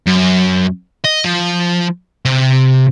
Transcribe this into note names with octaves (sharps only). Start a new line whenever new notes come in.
F#2
D#5
F3
C3